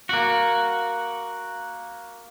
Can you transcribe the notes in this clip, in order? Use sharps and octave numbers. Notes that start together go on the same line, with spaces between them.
A#3 F#4